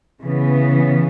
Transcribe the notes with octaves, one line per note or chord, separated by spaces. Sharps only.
C#3 E3 B3